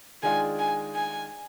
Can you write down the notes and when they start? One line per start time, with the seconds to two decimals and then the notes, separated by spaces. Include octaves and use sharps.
0.23 D#3 G#3 D4 F4 G#5
0.59 G#5
0.95 G#5